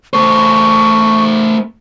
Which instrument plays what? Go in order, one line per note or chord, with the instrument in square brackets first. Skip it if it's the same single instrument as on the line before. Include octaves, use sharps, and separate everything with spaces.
[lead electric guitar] A3 C5 [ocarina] C#6